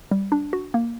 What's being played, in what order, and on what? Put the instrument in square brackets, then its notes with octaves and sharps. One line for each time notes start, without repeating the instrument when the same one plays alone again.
[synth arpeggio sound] G3
D4
F#4
A#3